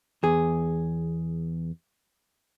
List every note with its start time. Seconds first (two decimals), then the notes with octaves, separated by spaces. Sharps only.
0.23 E2 G#4